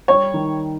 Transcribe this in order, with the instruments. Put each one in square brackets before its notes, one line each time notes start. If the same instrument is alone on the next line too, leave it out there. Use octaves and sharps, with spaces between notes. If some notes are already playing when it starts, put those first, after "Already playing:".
[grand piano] G3 [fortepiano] C#5
[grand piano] D#3